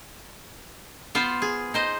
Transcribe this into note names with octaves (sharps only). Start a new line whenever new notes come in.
B3 F4 B4 C5
G#4
D#4 C5 D#5